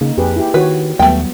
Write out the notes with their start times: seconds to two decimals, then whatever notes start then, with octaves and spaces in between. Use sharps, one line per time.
0.01 C#3 A#3 D#4
0.18 F2 G4 G#4 B4
0.36 E4 G4
0.54 D#3 F#4 B4 C#5
0.99 D#2 F#3 G3 A3 B3 G5